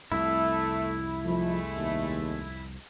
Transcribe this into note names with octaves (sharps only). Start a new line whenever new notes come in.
C2 F2 A3 E4
F3 G#3 A3
D#2